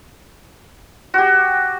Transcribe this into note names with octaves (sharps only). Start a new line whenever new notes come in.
F#4 G4